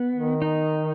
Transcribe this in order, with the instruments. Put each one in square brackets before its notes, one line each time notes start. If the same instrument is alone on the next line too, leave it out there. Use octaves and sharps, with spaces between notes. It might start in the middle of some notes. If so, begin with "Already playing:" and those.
Already playing: [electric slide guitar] B3
[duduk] D#3
[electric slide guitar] D#4